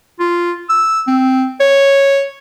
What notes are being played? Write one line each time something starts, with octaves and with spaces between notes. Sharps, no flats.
F4
E6
C4
C#5